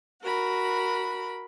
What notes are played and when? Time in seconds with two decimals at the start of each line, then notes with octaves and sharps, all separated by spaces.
0.24 F#4 A#4 B5